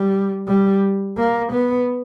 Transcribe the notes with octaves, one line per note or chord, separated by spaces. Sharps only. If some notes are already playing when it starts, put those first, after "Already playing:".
Already playing: G3
G3
A#3
B3